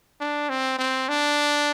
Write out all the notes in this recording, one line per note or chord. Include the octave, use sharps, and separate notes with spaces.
D4
C4
C4
D4